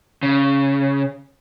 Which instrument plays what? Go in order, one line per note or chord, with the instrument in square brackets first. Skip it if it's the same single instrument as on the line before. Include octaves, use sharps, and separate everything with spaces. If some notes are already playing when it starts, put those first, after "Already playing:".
[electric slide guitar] C#3